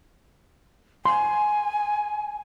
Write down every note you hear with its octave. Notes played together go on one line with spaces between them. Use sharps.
G#5 C6